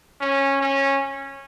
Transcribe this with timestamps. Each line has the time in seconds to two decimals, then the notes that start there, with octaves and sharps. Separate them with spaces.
0.21 C#4
0.61 C#4